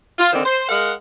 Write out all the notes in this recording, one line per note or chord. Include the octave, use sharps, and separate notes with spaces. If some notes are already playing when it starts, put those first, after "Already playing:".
F4
D3 D#3 C4 D#4 C5
C5
G#3 A#4 F5 F#5